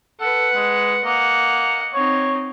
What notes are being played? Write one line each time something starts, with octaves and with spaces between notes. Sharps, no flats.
A4 B4 F#5
G#3
A#3 D#5 F#5
C4 D#4 C#5